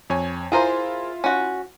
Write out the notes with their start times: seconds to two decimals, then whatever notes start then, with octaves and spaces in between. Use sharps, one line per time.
0.10 F2 C#5 G#5
0.52 E4 F4 G#4 A#4 C5
1.24 C#4 F#4